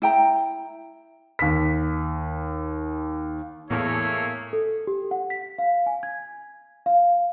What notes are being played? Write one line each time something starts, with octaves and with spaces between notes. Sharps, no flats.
E4 G5 A#5
D#2 B6
E2 A2 A3 A#3 G#4 A4 C#5
A4
G4
F#5
B6
F5
G#5
G#6
F5